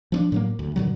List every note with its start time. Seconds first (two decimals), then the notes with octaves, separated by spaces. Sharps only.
0.12 F3 C4 D4
0.32 A2 F#3 A#3
0.59 D2
0.76 G2 A#2 D3 F#3